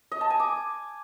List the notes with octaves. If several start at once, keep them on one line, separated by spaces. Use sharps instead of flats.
D#5
A5
G#5
D6